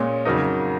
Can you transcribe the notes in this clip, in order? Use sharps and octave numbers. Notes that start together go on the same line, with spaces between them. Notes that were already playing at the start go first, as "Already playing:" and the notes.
Already playing: A#2 G#3 C#4
F2 C#3 F#3 A#3 D#4